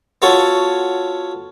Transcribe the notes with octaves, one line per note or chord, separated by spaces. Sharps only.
B3 F4 F#4 A4 C#5